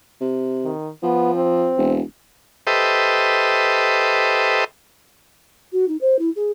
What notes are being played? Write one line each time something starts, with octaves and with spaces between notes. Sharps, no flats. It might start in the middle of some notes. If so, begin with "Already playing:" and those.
C3
D#3
F3 B3
C4
E1
G4 A4 B4 C5 D#5 E5
F#4
D#4
C5
E4
G#4